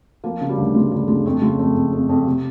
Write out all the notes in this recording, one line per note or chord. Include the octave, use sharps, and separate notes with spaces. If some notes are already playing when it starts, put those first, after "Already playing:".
F3 A#3
C#3
G3
D2
C#3 G#3
D2 G3
D2 G#3
F2 A3
C#3 G#3
F2 A3
F2
F2
F2
C3